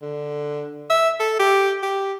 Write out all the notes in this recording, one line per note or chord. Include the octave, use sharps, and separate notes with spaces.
D3
E5
A4
G4
G4